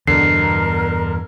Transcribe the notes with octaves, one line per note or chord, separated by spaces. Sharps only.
E2 G2 B2 D3 A#4 C7